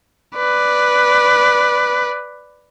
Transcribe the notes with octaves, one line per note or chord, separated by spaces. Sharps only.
B4 D5